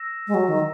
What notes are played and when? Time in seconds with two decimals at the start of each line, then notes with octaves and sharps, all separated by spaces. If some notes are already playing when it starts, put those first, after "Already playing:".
Already playing: E6 A#6 E7
0.27 G#3
0.34 F#3
0.48 D#3